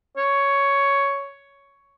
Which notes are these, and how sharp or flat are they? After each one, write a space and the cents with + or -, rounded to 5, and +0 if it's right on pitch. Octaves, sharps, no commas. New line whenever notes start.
C#5 +10